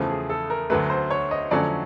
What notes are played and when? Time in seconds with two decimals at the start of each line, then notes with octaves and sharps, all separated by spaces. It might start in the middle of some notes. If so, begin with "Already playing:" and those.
Already playing: E2 C#3 F3 A3
0.10 G#4
0.30 A4
0.50 A#4
0.70 D2 D3 F#3 A3 B4
0.90 C5
1.10 C#5
1.31 D#5
1.51 F2 D3 F#3 A3 C#4 D5